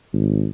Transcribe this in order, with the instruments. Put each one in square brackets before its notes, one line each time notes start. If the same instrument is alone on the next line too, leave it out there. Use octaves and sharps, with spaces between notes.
[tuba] G#1